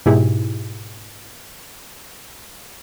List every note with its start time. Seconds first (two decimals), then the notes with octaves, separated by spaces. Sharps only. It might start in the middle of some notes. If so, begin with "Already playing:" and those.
0.06 G#2 B2 E4 G4 G#4